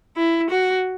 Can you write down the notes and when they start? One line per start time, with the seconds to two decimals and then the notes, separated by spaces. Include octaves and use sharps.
0.17 E4
0.50 F#4